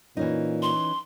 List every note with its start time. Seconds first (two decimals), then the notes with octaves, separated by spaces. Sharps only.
0.17 A#2 E3 C#4 D#4
0.62 C6